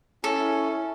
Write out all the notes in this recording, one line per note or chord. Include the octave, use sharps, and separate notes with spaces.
C#4 E4 A4